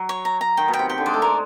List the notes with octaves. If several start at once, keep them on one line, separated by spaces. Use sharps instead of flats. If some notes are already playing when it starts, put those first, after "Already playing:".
Already playing: F#3
C#5
A#5
A#5
D#3 G5
B2
G5
C3
C3 G5
D3
G#3 D5
A3
G#3 A#4